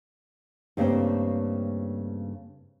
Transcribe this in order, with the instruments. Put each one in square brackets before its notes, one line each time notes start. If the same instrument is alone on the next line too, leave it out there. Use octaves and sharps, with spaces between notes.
[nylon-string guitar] G2 C#3 A3 A#3 C4